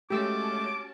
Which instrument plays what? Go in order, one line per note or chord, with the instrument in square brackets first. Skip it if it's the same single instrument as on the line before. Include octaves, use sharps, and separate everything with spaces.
[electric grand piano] G#3 A3 [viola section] C#4 F#4 A5 [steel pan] G4 E6 [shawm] D6